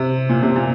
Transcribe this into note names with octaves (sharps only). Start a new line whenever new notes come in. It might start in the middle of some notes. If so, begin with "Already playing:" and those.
Already playing: C3
A#2
C3
A#2